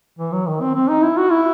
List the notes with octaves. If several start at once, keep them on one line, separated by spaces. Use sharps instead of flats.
E3
F#3
D#3
C4
C4
D#4
E4
F#4
E4